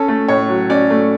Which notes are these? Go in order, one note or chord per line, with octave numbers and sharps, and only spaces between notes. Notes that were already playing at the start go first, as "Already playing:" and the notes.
Already playing: C#4 A4
A3
A2 C#5
F#3
C#4 D5
A3